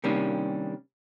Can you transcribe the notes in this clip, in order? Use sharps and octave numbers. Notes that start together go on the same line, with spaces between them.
C3 D#3 G3 A#3 C#4 D4